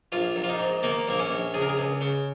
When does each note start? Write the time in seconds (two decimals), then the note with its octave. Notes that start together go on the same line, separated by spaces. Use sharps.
0.12 A#1 F4
0.36 A#1
0.43 F4
0.49 D#4
0.59 G#2
0.83 D#3 A#3
1.07 A#1 A#3
1.19 C#4
1.31 A#1
1.54 C#2 G#4
1.62 A#4
1.69 G#4
1.77 C#2
2.01 C#3